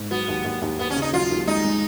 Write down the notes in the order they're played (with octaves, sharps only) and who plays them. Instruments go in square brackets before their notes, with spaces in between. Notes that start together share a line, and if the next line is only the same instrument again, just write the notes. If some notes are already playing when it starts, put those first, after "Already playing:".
Already playing: [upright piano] G#2
[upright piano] F#3 [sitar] B3
[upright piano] D#2
D#2
D#2
[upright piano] D#2 [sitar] B3
[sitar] C#4
[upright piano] C#3
[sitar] D#4
[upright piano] F#3 [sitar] F4
[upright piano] D#2
[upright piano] G#3 [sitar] D#4
[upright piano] G#3